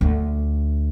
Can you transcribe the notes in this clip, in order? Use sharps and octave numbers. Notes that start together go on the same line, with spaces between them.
D2